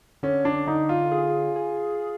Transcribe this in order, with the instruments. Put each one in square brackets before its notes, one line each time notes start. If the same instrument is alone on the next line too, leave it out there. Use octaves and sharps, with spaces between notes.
[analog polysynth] D3 [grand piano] C#4
[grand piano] D4
[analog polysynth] D3 [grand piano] D#4
[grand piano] F4
[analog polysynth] G#4
G#4